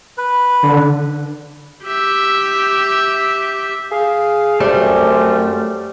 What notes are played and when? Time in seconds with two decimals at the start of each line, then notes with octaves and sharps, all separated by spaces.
0.18 B4
0.63 D3
1.85 G4 E5
3.91 G#4 F5
4.60 F#2 G3 A3 C4 C#4